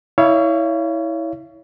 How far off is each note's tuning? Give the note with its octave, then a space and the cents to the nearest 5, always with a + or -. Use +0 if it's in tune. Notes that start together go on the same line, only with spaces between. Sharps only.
E4 -20 C#5 +20 F5 -35